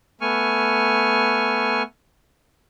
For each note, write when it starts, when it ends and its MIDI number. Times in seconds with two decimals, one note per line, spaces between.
0.21 1.83 57
0.21 1.83 59
0.21 1.83 80
0.21 1.83 85
0.21 1.83 89